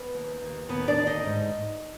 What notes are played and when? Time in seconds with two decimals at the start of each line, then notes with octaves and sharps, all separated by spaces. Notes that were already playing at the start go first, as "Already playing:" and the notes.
Already playing: B3 B4
0.14 D#2
0.41 D#2
0.69 D#2 B3 B4
0.88 D4 D5
0.97 D3
1.07 D#4 D#5
1.25 G#2